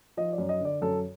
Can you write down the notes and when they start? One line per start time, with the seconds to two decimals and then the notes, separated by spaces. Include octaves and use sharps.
0.17 F3 D#5
0.33 D5
0.38 F#2
0.49 D#5
0.60 D3 D5
0.82 F#2 A4